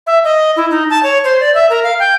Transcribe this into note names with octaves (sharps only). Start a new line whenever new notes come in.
E5
D#5
E4
D#4
A5
C#5
C5
D5
E5
A#4
F5
G5